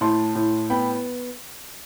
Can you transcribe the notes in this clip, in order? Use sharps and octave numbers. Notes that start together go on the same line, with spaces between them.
A2 A5 C6
A2
B3 G5 B5